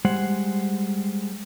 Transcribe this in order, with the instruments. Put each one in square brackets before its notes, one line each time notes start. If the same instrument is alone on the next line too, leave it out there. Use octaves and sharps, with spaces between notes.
[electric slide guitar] G3 G#3 C5 F#5